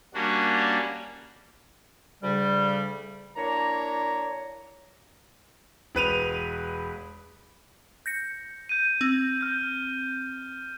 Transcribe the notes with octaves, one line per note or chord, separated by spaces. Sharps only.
G3 A#3 C#4 D4 F#4
D2 C#3 G3
A#3 D4 E4 C#5 A#5
E1 B4 D#7 F7
G6 A#6 C#7
G6 D#7
C4
F6 G6